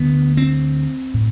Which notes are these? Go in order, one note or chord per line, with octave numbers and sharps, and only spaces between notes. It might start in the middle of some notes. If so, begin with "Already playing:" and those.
Already playing: D2 D3 B3
C4
A2